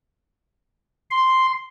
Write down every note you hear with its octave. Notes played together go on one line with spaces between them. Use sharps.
C6